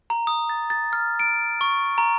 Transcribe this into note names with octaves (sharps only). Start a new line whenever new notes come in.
A#5
D#6
A6
A6
F6
D7
C#6
A#5